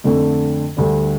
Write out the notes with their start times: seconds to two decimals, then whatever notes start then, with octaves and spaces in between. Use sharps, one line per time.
0.04 F2 D3 A3
0.77 D2 D3 G3